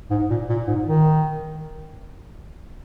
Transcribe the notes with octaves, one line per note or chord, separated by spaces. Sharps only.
G#2
A#2
A#2
G#2
D#3